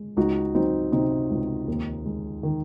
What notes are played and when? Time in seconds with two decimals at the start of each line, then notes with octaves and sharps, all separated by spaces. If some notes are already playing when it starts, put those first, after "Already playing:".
Already playing: G#3
0.17 C#2 D#4 F#4
0.55 F#3 C4 D#4
0.92 C3 C4 D#4
1.30 C#2
1.68 D#2
2.06 G#3
2.43 D#3